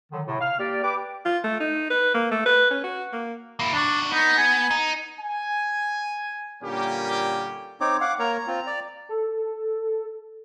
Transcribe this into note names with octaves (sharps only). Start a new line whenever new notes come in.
D3 D#3 F#3
A2 C3
F5 F6
A#3 G4 D5
G4 B4 D6
F4
A3
D#4
B4
A#3
A3
B4
C#4
F#4
A#3
A#3 E4
E2 D4 F#4
B3 D#4
G#5
D#4
G#5
A#2 D3 G3 A#3 C#4 G4
C4 D#4 C#5 D6
F5 F#5 D6
A#3 A#4 C#5 A#5
C4 F4
D5
A4